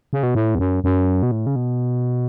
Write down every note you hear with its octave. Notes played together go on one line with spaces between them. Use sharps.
C#3
B2
A2
E2
F#2
F#2
B2
A2
C#3
B2